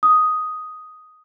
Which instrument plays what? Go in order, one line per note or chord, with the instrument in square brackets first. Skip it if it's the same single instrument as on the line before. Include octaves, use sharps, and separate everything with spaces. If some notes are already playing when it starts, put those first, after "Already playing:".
[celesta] D#6